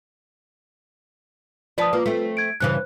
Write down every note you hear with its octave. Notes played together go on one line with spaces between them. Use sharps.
F3 F4 B4 D5 A5 D#6
A#3 F4 B4
A3 C4
G#6 D7
G2 C#3 E3 C5 F#6